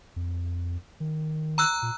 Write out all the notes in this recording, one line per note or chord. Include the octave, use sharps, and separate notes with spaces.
F2
D#3
A#5 E6 F#6
A#2